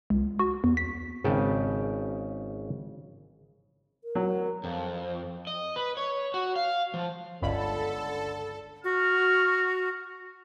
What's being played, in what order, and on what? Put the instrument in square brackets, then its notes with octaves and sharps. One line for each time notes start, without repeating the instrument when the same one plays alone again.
[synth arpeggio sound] C#2
F#4
E2
B6
[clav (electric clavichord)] G#1 C#3 G5 A5
[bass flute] A#4
[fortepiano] F#3
[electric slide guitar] F2
D#5
B4
C#5
F#4
F5
F3
[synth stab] G1 C#2 B5 [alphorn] D3 [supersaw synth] A4
[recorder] F#4 [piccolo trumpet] F6